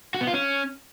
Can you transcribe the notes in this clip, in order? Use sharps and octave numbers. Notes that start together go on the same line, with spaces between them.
F#4
B3
F4
C#4